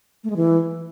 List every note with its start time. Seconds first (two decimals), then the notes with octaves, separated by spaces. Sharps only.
0.24 A3
0.30 G#3
0.36 E3